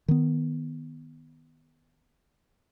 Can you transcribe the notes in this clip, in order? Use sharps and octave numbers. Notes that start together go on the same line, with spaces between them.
D#3 B3